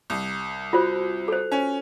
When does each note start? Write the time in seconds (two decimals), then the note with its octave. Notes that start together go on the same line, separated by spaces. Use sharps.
0.10 C2
0.73 F4 F#4 C5
1.28 A4 C5
1.52 C#4